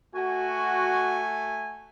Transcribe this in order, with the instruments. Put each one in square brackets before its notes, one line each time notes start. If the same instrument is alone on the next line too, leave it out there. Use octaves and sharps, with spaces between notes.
[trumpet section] A3 G#5 [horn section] F#4